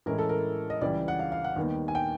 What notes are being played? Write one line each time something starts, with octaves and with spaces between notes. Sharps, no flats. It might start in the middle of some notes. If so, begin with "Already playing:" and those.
A2 E3 G#3 C#4 E4 A#4
A4
A#4
D#5
C#2 C#3 E3 G3 D5
F#5
F5
F5
F#5
D#2 D#3 G3 B3 D#4
G#5
G5